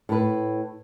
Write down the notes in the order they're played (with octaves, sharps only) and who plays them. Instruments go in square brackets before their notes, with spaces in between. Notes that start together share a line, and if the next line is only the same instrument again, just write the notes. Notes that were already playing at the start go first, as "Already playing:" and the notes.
[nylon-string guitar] A2 B4